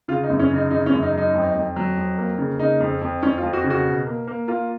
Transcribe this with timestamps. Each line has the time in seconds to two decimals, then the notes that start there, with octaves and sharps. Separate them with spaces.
0.08 C#3 F4
0.23 D#4
0.30 F#2
0.39 C#4
0.50 C#3 D#4
0.71 C#3 D#4
0.86 C#4
0.92 F#2
1.03 D#4
1.12 F#3
1.18 D#4
1.34 F2
1.55 F2
1.76 F#3
1.97 F2
2.18 A#3
2.38 C#3
2.59 C#3 D#4
2.80 F2
3.01 F2
3.23 F2 C#4
3.38 F4
3.43 F2
3.53 F#4
3.64 C#3
3.70 F#4
3.85 B2
4.06 A#3
4.28 A#3
4.48 A#3 F4